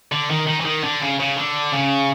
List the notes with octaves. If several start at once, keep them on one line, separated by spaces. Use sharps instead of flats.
D3
D#3
D#3
E3
D#3
D3
C#3
C#3
D3
C#3